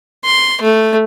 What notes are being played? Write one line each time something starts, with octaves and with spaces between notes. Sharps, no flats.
C6
A3